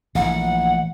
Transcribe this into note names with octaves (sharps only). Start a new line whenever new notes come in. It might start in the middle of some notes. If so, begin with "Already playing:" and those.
A#1 E3 A3 F#5